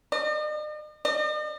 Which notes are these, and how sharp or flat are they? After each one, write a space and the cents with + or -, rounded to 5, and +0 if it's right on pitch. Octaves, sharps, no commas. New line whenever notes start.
D#5 -45
D#5 -45